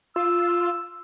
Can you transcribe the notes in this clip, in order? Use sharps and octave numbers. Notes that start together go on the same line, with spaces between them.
F4 E6